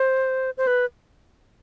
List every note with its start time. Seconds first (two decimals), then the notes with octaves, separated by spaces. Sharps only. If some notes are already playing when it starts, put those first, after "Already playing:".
Already playing: C5
0.58 C5
0.67 B4